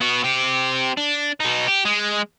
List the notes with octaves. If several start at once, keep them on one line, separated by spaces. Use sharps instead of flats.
B3 F#4
C4 G4
D4
B2 D#4
G4
G#3